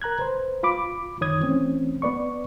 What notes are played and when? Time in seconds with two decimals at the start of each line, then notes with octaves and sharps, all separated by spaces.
0.02 A#4 A#5 F#6 G#6
0.19 B4 C5
0.63 F4 B5 D6
1.21 F#2 D#3 C#5 D#6 G#6
1.40 E3 A3 C4 C#4
2.02 B3 B4 D5 C#6